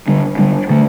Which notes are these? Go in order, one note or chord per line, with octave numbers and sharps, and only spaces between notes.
D3 G3 D4
D3 G3 D4
D3 A3